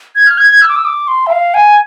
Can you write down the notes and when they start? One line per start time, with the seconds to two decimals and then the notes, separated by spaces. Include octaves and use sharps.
0.15 G#6
0.27 F6
0.38 G#6
0.50 G#6
0.62 E6
0.69 D6
0.76 E6
0.85 D6
1.08 C6
1.27 E5
1.31 F5
1.54 G#5